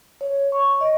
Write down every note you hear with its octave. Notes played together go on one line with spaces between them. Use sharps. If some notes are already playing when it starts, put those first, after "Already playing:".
C#5
C#6
D#5